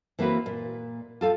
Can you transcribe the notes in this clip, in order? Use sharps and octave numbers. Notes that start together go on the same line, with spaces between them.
E3 A#3 C4 F#4 B4
A#2
F4 A4 F5